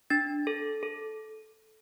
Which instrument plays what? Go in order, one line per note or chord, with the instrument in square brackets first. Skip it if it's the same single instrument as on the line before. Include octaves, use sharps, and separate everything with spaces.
[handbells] D4 A6
A4
A4